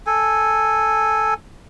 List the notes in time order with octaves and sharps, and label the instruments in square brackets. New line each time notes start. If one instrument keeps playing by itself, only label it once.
[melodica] A4 G#5